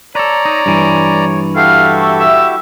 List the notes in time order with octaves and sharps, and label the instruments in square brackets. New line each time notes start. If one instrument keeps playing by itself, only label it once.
[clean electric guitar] A4 B4 [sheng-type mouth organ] C#5 [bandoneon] D5 A#5
[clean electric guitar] D#4
G2 E3
[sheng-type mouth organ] E4 F#4 G4 [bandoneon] A4 [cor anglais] F5
[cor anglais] A3
E5